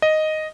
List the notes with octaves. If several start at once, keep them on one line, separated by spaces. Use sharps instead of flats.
D#5